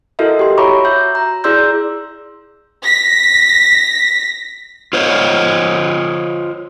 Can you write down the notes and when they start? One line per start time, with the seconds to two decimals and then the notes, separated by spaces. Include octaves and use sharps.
0.19 E4 F#4 A4 A#4 D#5 E5
0.39 G4 C6
0.57 C#5 E5 A#5 B5 C#6 D6
0.85 F#4 E5 G6
1.15 A#5
1.44 E4 G#4 D5 C6 E6 G6
2.84 A#6 B6
4.93 F4 C5 C#5 D#5